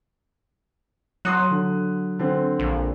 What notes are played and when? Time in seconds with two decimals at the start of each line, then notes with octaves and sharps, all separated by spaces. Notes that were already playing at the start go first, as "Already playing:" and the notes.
1.25 F#3 C6 D#6 F#6
1.50 D3
2.19 D3 C4
2.59 A#1